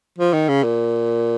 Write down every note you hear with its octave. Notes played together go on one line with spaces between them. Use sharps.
F3
D#3
C#3
A#2